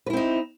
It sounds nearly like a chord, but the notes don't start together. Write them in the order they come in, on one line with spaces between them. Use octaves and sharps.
B4 E4 C4 D#4